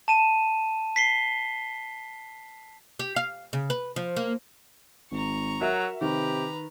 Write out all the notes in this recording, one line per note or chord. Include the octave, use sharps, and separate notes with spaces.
A5 D#7 E7
B6 C7 G7
G4
F5
C#3
B4
F3
A#3
G#1 A#5 C#6
F#3 F#4 A#4 E5
C3 D#3 G4 B4 A#5